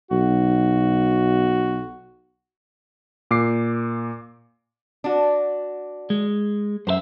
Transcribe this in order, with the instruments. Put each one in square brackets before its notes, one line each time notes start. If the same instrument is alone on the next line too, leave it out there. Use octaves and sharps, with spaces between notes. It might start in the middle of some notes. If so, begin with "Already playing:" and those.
[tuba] B1 [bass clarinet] F#4
[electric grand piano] A#2 D6 C7
[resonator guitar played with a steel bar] D4 F#4
[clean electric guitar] G#3
[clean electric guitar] F#2 A#4 E5 [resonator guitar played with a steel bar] C5